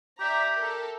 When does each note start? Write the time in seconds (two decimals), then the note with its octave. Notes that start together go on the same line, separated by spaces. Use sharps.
0.20 G4 D5 E5 A#5
0.56 A4 A#4